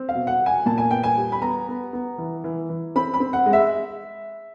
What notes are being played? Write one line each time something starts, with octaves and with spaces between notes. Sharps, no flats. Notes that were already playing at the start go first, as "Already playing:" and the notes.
Already playing: C4
F5
B2
F#5
B2
G#5
A#2 A5
G#5
B3 G5
G#5
G3
B5
B3 A#5
B3
B3
E3
E3
E3
C4 B5
B5
C4
F#5
G#3
E5